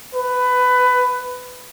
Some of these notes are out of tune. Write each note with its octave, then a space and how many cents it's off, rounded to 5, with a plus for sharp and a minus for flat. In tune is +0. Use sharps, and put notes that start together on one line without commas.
B4 +15